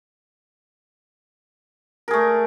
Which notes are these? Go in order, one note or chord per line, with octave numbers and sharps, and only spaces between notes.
A3 G#4 A#4